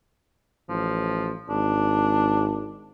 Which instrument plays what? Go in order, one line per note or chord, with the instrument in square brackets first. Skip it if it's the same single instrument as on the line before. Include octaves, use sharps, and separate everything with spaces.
[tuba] A1 [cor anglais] F3
[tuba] G#1 [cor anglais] D4